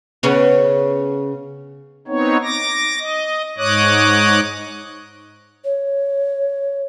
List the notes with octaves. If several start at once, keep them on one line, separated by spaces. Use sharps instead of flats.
C#3 B3 C#4
B3 C4 D#4 C#5
D6 A#6
D#5
G#2 C#5 D#5 D6 D#6 F#6
C#5